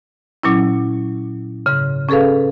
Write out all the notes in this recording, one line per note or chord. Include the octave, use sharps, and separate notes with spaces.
A#2 F#3 C#4 E4
G#2 C#3
C#4 G#4 A4 B4 F5